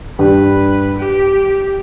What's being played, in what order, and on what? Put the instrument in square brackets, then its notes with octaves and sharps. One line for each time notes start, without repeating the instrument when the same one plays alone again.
[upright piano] G2 G3 [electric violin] B4
[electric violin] G4